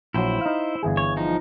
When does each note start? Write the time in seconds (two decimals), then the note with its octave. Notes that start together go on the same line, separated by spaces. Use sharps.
0.14 A#1 F#3 E4 C5
0.41 D#4 F5
0.83 G1 E3 G#4
0.97 C#5
1.17 F3 D#4